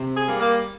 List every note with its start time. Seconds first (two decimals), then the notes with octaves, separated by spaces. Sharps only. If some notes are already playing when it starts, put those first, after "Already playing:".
Already playing: C3
0.16 G#4
0.27 G3 A#3
0.39 A#3